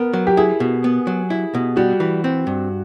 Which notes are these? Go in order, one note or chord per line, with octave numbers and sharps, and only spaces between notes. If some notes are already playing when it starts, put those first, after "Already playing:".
Already playing: B3 A#4
F#3
G4
E4 G#4
B2
B3
F#3
E4
B2
G3 F#4
E3
C4
G2